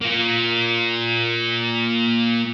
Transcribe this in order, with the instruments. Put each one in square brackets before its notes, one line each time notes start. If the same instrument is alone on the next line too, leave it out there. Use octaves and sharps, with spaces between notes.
[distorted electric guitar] A#3 F4